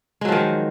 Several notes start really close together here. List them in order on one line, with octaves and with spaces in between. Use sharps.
G#3 F#3 F3 D#3